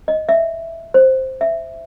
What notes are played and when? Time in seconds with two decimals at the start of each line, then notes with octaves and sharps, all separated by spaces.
0.08 D#5
0.29 E5
0.94 C5
1.41 E5